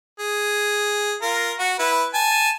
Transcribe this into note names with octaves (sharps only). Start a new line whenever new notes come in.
G#4
F4 A#4
F#4
E4 B4
G#5 A5